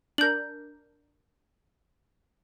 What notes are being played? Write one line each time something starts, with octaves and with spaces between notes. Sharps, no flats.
D4 A#4 G6 F#7